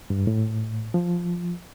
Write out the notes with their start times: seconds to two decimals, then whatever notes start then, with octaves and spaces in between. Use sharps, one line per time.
0.10 G2
0.27 A2
0.94 F3